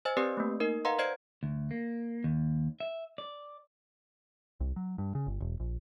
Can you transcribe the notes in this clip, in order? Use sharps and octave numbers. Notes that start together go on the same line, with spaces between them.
C5 D#5 G#5 E6 A6
C4 G4 B4 D5 D#6 C7
A3 A#3
D#4 A#4 D#5
B4 D#5 F5 F#5 A#5 C6
C5 D5 D#5 G#6 C7 D7
D2
A#3
D#2
E5
D5
C2
F#3
G2
C#3
G1
E1
A#1